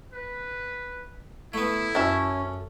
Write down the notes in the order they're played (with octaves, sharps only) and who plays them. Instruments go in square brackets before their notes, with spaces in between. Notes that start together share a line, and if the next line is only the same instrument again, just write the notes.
[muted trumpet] B4
[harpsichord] A3 B3 [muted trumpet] E4
[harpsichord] F#2 [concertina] C#4 [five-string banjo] A4 E5